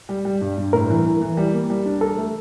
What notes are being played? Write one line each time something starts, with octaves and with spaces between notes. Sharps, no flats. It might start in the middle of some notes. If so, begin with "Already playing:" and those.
G3
G3
G2
G2
A2 A#4
E3
E3
E3
G3
A#3
G3
D4
A4 A#4
A3